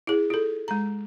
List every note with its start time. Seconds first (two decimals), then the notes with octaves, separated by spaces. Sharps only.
0.07 E4 G#4
0.30 F4 A4
0.68 G#3 A#5